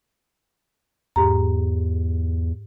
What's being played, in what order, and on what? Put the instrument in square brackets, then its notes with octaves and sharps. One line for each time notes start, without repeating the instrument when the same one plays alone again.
[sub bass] E2 [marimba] G#2 G4 A#5